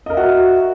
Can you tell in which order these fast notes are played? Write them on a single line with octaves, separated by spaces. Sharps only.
D#5 A#4 E5 F#4